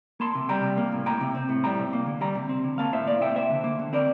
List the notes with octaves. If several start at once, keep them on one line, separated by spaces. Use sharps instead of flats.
A#3 A5 C6
C3
G3 G5 A#5
C3
A#3
A2
A#3 G5 A#5
C3
C4
A2
G3 G5 A#5
C3
A#3
D3
G3 G5 A#5
C3
C4
D3
A#3 F5 A5
A2 C5 E5
A#3 D5 F5
C3 E5 G5
A#3 C5 E5
D3
A#3
D3
C4 A#4 D5